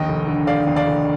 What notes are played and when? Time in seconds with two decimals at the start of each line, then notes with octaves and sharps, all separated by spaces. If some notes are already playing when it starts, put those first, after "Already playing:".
Already playing: A#1 D#2 D#5 G5
0.08 F1
0.28 D3
0.47 F1 D5 F5
0.67 D#2
0.76 D5 F5
0.87 F1